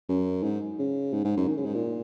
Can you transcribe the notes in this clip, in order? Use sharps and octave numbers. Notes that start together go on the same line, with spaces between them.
F#2
G#2
C#3
G#2
G#2
F#2
D#3
C#3
G#2
A#2